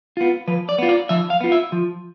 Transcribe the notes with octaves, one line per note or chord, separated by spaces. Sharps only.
B3 F4
F3 B4
D5
B3 F4
D5
F3 E5
F5
B3 F4
E5
F3